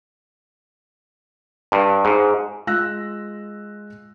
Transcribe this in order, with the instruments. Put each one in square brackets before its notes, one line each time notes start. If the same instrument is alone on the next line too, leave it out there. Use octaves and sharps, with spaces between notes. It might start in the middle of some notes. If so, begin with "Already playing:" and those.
[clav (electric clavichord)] G2
G#2
[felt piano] G#3 F4 E6 F#6 A#6